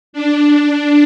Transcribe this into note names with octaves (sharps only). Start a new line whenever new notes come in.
D4